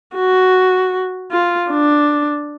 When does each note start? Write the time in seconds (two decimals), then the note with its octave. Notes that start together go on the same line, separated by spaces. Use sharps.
0.16 F#4
1.32 F4
1.71 D4